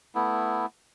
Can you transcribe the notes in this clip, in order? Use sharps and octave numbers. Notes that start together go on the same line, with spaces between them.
A3 B3 E4